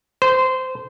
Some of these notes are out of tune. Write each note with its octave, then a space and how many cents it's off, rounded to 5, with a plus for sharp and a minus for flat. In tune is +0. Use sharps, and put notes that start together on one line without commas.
C5 -20